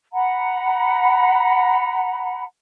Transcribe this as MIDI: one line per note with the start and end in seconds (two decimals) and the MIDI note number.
0.13 2.44 78
0.13 2.44 82
0.13 2.44 83